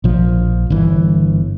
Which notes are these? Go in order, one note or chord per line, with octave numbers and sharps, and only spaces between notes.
A#1 F3
G1 E3